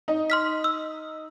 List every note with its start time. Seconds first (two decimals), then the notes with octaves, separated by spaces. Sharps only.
0.08 D#4
0.30 C6 F6 B6
0.64 E6